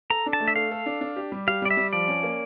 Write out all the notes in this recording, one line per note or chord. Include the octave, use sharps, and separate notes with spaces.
A4 A#5
D4
A5
A3
E5
A4 F5
A4
D4
D4
G4
G3
G4 F5
G3 D5
E5
G3
F3 D5
C#4
A#3